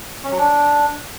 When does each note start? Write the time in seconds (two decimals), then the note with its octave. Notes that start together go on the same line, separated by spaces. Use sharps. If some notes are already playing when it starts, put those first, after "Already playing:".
0.24 C#4
0.31 F#3
0.39 D4